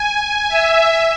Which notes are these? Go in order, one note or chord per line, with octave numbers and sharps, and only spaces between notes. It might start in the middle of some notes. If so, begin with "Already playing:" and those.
Already playing: G#5
E5